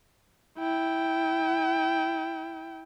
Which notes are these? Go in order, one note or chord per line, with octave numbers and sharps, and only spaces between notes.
E4 G5